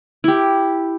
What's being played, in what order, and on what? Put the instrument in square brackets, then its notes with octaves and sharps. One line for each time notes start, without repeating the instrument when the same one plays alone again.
[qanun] E4 G4